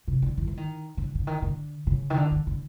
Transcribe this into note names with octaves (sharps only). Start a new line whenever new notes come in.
C3
D3
E3
E3
D#3
D3
D3
D#3
D3
C#3
D#3
D3
D#3
D3